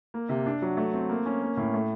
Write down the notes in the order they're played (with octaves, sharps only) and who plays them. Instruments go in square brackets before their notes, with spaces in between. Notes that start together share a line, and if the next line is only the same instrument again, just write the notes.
[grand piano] A#3
C3
D4
F#3
A3
C4
A#3
C#4
A#3
A2
A3